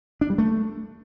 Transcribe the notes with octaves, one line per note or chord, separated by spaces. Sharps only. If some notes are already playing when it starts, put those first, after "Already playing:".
D4
G3
A3